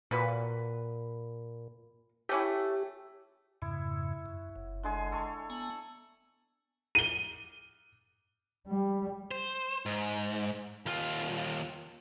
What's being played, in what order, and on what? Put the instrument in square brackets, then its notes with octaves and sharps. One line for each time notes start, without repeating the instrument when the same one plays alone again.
[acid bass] A#2 [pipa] F#4 B4
[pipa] A3 C#4 E4 [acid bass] G4
[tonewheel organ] F2 G#2 C#3 [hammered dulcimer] E4
[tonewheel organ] F#2
F#1
[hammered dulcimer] D3 G#3 G#4
A4 C#5
[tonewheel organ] B3 G#5 A#5
[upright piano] D#7 G7
[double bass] G3
[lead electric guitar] C5
G#2
D#2 F4